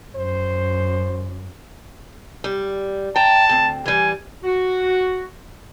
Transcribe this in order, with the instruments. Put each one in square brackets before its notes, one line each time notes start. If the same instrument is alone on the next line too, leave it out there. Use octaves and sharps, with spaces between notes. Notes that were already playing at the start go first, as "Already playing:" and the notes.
[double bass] F#2 [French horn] C5
[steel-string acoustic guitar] G3
[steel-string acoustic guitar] G5 A#5 [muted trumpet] A5
[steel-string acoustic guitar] D2 C4
[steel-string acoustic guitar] E3 G3 [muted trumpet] G#5
[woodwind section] F#4